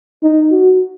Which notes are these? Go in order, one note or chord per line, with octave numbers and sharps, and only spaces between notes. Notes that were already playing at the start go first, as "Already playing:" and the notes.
D#4
F#4